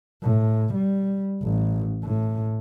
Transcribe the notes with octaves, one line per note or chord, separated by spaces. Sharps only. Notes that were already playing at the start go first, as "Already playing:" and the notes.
A2
G3
A1
A2